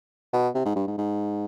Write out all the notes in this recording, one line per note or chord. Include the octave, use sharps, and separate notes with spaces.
B2
C3
G#2
G2
G#2
G#2